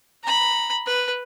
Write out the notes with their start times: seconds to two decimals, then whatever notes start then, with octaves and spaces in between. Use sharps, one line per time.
0.23 A#5 B5
0.86 B4